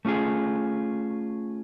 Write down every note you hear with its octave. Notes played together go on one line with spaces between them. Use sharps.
A3 C#4 F4 G#4